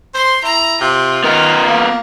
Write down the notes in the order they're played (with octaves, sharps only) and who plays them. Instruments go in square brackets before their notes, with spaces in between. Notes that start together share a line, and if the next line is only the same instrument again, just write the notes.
[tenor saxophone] C5 [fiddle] C6
[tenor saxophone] E4 [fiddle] A#5
[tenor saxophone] C3 [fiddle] F4
[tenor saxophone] D#3 [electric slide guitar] B3 A#4
[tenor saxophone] A#3